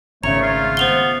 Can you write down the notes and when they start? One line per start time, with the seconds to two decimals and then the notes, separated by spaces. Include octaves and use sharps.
0.24 G#1 C#3 A3 C#5 A#5
0.42 F4
0.77 B3 C5 F7 G7